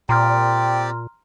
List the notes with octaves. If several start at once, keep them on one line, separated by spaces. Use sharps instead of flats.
A#2 C4 G4 D5 A#5 C6 F6